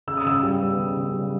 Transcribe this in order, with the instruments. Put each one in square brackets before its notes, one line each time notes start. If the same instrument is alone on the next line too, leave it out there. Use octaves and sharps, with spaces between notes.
[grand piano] C#3 [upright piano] E6
[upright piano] D#6
[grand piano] C#3 [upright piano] E6
[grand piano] G3
B3
C#3
C#3
G3